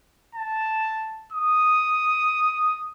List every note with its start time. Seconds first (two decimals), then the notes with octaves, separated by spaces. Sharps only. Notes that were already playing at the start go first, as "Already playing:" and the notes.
0.35 A5
1.32 D#6